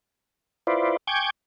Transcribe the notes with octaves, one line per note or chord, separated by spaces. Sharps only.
E4 F4 B4 C5 D5
G5 G#5 C#6 D6 G6 G#6